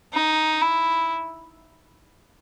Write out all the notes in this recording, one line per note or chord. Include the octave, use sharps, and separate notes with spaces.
D#4
E4